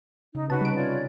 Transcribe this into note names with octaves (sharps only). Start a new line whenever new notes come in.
C#3 D#4
C3 C#4 D#4 F#4 B4 A5
G3 D7
F4 C#5 D5